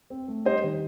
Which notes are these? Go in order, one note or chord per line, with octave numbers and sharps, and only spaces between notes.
C4
A3
G3 C5 D#5
D#3